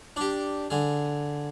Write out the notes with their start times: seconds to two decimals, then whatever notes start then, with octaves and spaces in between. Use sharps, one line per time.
0.16 D4 G4
0.70 D3 G#4